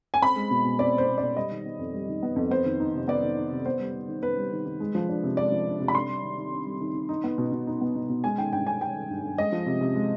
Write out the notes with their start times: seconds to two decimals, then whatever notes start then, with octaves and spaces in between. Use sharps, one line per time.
0.14 G#5
0.22 C4 B5
0.36 G#3
0.51 B2
0.64 B2
0.79 C4 D5
0.93 G#3
0.98 C5
1.08 B2
1.18 B2 D5
1.36 G3 D#5
1.51 D#3
1.66 B3
1.79 F2
1.94 G3
2.09 D#3
2.23 B3
2.36 F2
2.51 B3 C5
2.65 D#3
2.80 D#4
2.94 C3
3.08 B3 D5
3.23 D#3
3.37 D#4
3.51 C3
3.66 B3 C5
3.79 G3
3.94 D#3
4.08 D#3
4.22 B3 B4
4.37 G3
4.52 D#3
4.66 D#3
4.80 G#3
4.95 F3
5.09 D4
5.23 C3
5.37 G#3 D5
5.52 F3
5.66 D4
5.80 C3
5.88 B5
5.94 D4 C6
6.09 G3
6.23 D#3
6.38 D#3
6.52 D4
6.66 G3
6.81 D#3
6.94 D#3
7.09 D#4
7.24 B3
7.38 B2
7.52 B2
7.67 D#4
7.81 B3
7.96 B2
8.09 B2
8.24 G#3 G#5
8.38 D#3 G5
8.52 G2 G5
8.67 G2 G#5
8.81 G#3 G5
8.95 D#3
9.10 G2
9.23 G2
9.38 G#3 D#5
9.52 F3
9.66 C3
9.81 C3
9.96 G#3